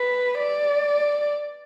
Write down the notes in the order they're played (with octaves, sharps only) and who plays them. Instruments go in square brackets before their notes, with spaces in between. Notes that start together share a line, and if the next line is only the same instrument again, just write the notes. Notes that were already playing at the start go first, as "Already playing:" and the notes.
Already playing: [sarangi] B4
D5